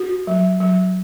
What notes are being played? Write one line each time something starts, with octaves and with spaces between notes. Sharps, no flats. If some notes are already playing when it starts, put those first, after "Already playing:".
Already playing: F#4
F#3
F#3